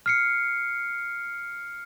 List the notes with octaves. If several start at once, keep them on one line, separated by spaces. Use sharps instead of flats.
F6 C7 C#7